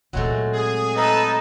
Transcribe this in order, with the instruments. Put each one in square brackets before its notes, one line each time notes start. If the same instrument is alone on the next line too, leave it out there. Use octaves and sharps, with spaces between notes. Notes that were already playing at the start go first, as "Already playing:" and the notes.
[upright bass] A#2 C4 [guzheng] F#3 G#3 A3
[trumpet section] G#4
[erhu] D#4 [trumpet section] A4 B4